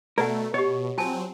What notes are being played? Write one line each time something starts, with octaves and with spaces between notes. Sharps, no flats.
B2 A3 A4 A#4 D5 F#5
B2 G4 C#5 D#5
F#3 C4 F4 G#5 A5